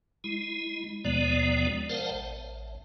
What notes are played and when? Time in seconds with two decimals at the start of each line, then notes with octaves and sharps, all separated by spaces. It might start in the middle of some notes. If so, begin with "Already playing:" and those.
0.24 G#3 E4
1.05 D#2 B2 F3 G#3 B3 D5
1.89 A#4 C5 D5 F5 F#5 A5
2.11 A1